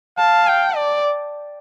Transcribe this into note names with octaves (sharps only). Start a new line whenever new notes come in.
F5 A5
G5
D5